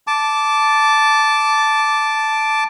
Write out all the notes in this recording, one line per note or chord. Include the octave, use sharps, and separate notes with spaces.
A5 D6